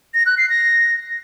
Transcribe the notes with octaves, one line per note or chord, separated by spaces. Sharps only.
A#6
F#6
C7
A#6